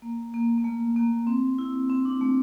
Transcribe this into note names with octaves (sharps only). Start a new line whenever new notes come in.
A#3
A#3
A#3
A3
A#3
C4
E4
C4
D4
A3